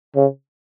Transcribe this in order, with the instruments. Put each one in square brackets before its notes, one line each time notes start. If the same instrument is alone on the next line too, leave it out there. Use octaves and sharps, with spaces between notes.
[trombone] C#3